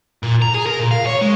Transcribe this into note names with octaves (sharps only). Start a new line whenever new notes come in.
A#2
A#5
G#4
A#4
A#2
F5
C#5
G#3